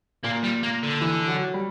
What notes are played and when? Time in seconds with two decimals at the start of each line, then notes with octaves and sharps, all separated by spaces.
0.24 A#2 A#3
0.44 G3
0.63 A#3
0.83 D3
1.01 E3
1.28 F#3
1.54 G3